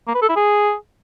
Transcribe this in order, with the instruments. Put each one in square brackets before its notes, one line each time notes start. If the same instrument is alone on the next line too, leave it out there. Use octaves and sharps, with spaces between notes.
[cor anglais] A#3
B4
A4
E4
G#4